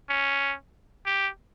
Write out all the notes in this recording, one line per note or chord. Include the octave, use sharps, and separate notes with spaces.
C#4
G4